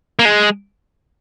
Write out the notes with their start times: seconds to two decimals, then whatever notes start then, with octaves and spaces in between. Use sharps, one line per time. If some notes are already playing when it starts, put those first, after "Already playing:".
0.19 A#3
0.25 G#3